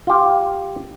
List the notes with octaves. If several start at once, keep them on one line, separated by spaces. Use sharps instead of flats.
F4 G4